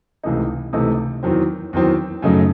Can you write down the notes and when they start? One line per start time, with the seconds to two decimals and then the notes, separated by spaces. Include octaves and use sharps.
0.23 C#2 C3 E3 A3 D#4
0.73 C#2 C3 E3 A3 D#4
1.23 E2 D#3 F#3 C4
1.73 E2 D#3 F#3 C4
2.22 F#2 C#3 F#3 A3 D#4